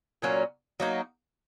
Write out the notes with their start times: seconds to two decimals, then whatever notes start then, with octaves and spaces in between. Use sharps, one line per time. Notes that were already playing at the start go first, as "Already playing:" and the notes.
0.22 A#2 F#3 A#3 C#4
0.80 F#3 A#3 D#4